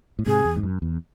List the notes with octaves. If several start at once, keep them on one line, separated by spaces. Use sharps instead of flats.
A2
G#2 C3 G#4
E2
G#2
F#2
E2